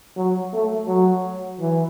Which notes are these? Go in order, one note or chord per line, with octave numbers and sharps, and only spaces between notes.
F#3
A3
F#3
E3